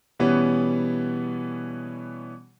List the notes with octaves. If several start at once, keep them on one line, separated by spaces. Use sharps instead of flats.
B2 E3 G3 B3 C#4